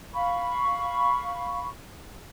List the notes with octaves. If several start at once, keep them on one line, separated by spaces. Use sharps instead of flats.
F5 B5 C#6